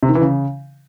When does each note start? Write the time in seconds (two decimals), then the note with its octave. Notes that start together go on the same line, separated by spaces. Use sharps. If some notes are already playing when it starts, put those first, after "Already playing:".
0.03 C3
0.09 D#3
0.15 E3
0.22 C#3